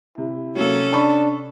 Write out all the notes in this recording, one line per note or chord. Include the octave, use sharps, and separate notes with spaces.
C3 E4
C3 F#3 A#3 C#4 A4
D4 A5 B5 C#6